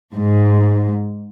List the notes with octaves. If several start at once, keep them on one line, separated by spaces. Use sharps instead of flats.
G#2